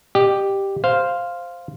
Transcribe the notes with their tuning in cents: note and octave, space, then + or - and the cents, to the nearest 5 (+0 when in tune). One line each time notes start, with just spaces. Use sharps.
G4 +0 D#5 -40
C5 +0 F5 +0